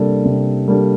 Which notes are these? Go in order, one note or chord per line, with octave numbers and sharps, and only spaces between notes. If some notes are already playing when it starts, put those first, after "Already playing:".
Already playing: C3 G3 A#3 D4 A4
C3
G3 A#3 D4 A4